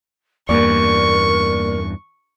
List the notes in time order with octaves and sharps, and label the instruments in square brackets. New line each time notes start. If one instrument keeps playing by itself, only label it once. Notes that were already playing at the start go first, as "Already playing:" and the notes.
[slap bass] E2 G2 [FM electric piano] A#3 D5 [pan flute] A#4 [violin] C#6